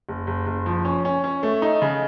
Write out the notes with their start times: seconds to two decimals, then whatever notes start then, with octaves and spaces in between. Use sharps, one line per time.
0.09 F#1
0.27 F#1
0.47 F#1
0.66 F3
0.85 C#4
1.05 C#4
1.24 C#4
1.43 A3
1.62 D#4
1.82 C#3